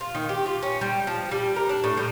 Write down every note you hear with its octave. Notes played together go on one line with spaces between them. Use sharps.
F4
D#3
G4
F4
C#4
G3
F3
G3
A#4
D4
A2
G3